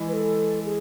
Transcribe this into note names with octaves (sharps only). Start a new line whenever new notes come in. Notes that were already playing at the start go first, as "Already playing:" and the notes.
Already playing: E3 G#3
B4
A4
G#4